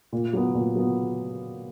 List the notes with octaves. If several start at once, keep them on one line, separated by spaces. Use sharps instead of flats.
A#2
F#3 B3
A#2
F#3 B3